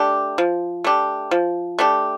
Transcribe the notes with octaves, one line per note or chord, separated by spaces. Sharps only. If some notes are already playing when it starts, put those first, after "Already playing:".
Already playing: A3 D4 G4
F3
A3 D4 G4
F3
A3 D4 G4